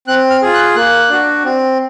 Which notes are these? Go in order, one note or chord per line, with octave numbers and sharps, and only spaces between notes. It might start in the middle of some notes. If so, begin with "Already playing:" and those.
C4 F#6
F6
F4 G#4
F#6
A#3 F#6
D4 F#4
C4